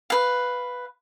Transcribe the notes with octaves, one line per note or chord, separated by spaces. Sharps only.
B4 F5